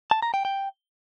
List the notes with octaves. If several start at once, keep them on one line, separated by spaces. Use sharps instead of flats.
A5
A#5
G5
G5